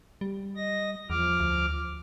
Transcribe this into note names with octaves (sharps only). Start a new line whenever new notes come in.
G3
D#5 A#6
E2 F3 D6 F6
D2